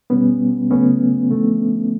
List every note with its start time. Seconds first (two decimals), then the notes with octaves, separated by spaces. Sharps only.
0.10 B2 G3 B3 C#4
0.70 C#3 F#3 A3 B3 C#4
1.31 D3 F3 A3